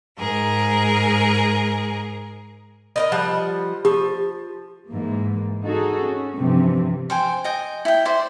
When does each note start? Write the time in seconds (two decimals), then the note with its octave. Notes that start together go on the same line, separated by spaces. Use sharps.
0.18 G#2 G#4 A#4
2.96 D#4 A#4 D#5
3.12 F3 G3 F#5
3.85 F3 G4
4.89 G#2 E3 A#3
5.63 D#4 F#4 G#4 A4
6.04 C#4
6.37 G2 C3 E3 F3
7.10 C5 G5 G#5
7.44 D#5 G5 G#5
7.85 E4 G5
8.05 E4 C5 D5